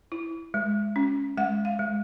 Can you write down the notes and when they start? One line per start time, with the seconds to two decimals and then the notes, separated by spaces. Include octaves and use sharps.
0.12 E4
0.54 G#3
0.96 C#4
1.37 G#3 F#5
1.65 F5
1.79 G#3